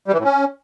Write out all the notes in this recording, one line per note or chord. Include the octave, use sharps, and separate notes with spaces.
G3
E3
A2
C#4